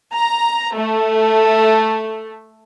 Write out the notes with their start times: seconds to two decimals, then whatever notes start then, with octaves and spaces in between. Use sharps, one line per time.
0.13 A#5
0.73 A3